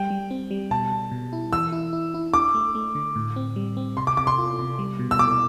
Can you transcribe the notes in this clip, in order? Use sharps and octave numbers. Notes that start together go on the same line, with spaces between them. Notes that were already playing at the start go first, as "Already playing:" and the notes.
Already playing: G3 G5
G3
C4
G3
B2 A5
B2
B2
E4
E3 E6
E4
E4
E4
D4 D6
A3
A3
D3
A2
C4
G3
C4
C3 C6
D6
C3 D6
C6
F4
C3
G3
B2
E6
B2 D6